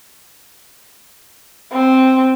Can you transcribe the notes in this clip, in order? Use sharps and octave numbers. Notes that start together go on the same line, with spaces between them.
C4